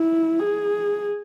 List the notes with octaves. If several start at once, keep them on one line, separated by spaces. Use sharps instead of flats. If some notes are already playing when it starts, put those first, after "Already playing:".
Already playing: E4
G#4